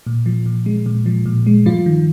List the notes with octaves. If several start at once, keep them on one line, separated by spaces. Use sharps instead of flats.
A#2
F3
A#2
G#3
A#2
F3
A#2
G#3
G2 F3 F4
D#3